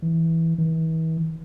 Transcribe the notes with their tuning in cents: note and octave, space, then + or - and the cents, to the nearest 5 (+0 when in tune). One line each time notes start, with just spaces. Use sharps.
E3 -10
E3 -40